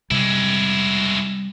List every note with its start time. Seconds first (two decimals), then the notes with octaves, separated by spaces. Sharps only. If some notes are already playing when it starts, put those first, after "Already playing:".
0.11 C3 G3 G#3 E4